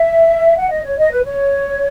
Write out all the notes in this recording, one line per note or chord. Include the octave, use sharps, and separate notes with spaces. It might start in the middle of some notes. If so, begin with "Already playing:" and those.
Already playing: E5
F#5
D#5
C#5
D#5
B4
C#5